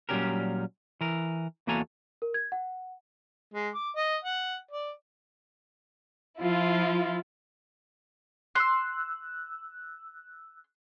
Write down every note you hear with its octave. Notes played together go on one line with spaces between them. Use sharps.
A#2 F#3 G3 C#4 G4 A#4
E3 A#4
E2 A#3 F#4 A4 G#5 A#5
A#4
G#6
F#5
G#3
D6
D#5
F#5
D5
F3 E4 F4
C6 E6 F#6